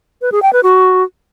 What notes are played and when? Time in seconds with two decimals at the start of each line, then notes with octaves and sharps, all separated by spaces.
0.21 B4
0.32 G#4
0.42 G5
0.53 B4
0.63 F#4